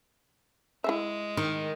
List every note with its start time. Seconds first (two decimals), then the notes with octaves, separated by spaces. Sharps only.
0.84 G#3 E4 G#4 E5
1.37 D#3